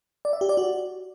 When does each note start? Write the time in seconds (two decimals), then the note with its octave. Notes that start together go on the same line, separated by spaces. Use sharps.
0.25 D5
0.33 E5
0.41 G4
0.49 D5
0.57 F#4